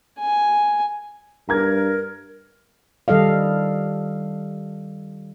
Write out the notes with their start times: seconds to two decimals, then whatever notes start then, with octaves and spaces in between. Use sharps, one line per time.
0.19 G#5
1.49 G2 A#4 A#5 G#6
3.08 D#3 G3 A4 D#5 F5